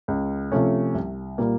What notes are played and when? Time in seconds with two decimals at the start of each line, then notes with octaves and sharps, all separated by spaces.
0.08 C#2
0.52 C3 F3 A3 C#4
0.95 C2
1.38 A#2 G3 A#3